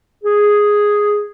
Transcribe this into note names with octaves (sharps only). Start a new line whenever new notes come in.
G#4